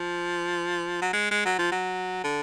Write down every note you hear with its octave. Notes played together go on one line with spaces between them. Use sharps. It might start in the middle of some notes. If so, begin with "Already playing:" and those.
Already playing: F3
F#3
G#3
G#3
F#3
F3
F#3
D3